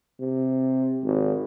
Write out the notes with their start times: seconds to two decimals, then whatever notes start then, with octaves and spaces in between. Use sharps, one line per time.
0.20 C3
1.04 G#1